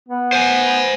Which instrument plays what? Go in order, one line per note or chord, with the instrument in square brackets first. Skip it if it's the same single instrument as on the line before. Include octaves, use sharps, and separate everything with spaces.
[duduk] B3
[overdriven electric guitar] C5 G#5